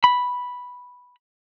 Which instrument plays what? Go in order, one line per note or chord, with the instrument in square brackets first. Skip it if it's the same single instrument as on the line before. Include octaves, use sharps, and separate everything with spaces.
[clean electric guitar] B5